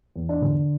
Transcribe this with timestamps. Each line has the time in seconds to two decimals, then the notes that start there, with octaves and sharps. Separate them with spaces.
0.16 E2
0.29 D4
0.42 D3